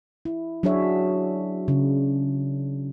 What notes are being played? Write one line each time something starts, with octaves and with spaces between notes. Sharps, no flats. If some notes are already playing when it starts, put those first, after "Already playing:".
E4
F#3 D4 F#4 G#4 C#5 E5
C#3